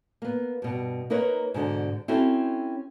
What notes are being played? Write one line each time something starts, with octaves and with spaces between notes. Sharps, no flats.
A#3 B3
G2 B2
A#3 D#4 A#4 B4 C#5
G#2 B2 D3 D4
C4 C#4 E4 F#4 A4